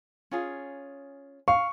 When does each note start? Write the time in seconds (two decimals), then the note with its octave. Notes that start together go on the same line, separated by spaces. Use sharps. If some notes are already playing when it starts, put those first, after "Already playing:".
0.31 C#4 F4 G#4
1.48 F5 C#6